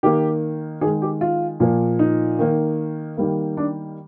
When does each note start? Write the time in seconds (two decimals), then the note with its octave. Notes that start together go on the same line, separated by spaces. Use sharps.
0.03 D#3 A#3 G4
0.81 D#3 G#4
0.86 G#3
1.02 G4
1.21 F4
1.60 A#2 F3 A#3
1.99 D#4
2.39 D#3 A#3
3.18 D#3 G3 A#3
3.57 D4